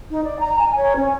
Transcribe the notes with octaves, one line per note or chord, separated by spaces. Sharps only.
D#4
D5
A#5
G#5
C#5
C#4